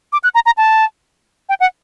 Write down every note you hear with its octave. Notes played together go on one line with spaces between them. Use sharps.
D6
F#6
A#5
A#5
A5
G5
F#5